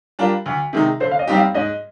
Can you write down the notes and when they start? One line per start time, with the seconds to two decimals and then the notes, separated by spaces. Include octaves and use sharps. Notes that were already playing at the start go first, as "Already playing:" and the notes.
0.19 G3 D4 F4 A#4
0.46 D2
0.73 C3 D#3 G#3 D#4
1.00 D3 C5
1.11 F5
1.19 D#5
1.27 G3 C4 D#4 G4
1.37 F5
1.55 G#2 D#5